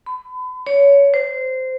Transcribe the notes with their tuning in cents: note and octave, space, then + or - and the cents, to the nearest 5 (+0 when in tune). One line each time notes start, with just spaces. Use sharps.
B5 +35
C#5 +20
C5 -20